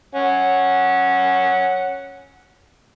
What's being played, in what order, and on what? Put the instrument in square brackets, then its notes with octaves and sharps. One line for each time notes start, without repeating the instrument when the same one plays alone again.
[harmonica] C#4 F#5